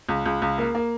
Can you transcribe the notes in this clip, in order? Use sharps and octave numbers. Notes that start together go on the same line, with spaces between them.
C#2
C#2
C#2
A#3
A#3